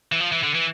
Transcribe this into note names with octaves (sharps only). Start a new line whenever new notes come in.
E3
F3
E3
D3
E3